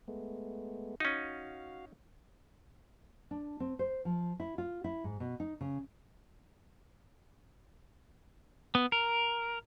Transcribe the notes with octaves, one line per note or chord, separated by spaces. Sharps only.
G#3 A3 B3
C#4 D#4 F#4 F5
D4
C4
C5
F3
E4
F4
E4
G#2
B2
D#4
C#3
B3
A#4